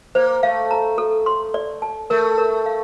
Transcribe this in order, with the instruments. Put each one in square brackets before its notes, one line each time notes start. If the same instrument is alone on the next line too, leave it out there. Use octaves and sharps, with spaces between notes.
[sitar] A#3 [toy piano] C5
[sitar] A3 [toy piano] F5
[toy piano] A#5
A4
C6
D5
A5
[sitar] A3 [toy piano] A#4
[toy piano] A#4
F5